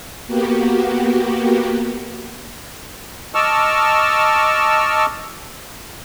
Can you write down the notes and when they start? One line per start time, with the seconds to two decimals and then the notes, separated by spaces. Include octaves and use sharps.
0.27 A#3 B3 F#4 G4
3.35 D#5 A5 C#6 D6 E6 F6